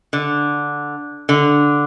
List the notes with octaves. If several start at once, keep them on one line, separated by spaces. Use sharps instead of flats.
D3
D3